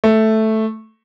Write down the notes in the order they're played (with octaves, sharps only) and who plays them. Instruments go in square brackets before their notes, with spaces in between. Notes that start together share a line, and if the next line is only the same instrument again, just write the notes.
[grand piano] A3